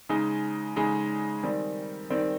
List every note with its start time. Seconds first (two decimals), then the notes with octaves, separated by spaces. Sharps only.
0.09 C#3 G#3 D#4
0.76 C#3 G#3 D#4
1.43 D#3 G3 C4
2.10 D#3 G3 C4